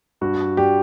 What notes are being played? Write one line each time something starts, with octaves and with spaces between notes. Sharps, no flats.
G2 F#4
G3 G4